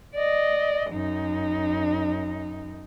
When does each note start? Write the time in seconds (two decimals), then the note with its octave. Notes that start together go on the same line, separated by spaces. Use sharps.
0.15 D5 D#5
0.91 F#2 D#4